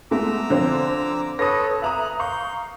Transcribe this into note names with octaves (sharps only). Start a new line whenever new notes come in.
G#3 A3 B3 A#5 D6 E6
D3 F3 C4
A4 B4 C#5 D#6 A#6
E5 A#5 D#6 F#6
F5 A#5 C#6 G6